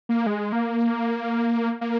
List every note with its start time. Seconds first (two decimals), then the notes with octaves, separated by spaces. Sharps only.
0.09 A#3
0.26 G#3
0.52 A#3
1.81 A#3